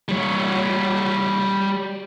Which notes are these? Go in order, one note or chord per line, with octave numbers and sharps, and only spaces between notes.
G3 C#5